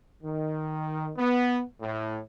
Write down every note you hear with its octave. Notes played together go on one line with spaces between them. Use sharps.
D#3
B3
A2